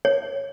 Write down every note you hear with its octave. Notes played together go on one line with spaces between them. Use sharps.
C#5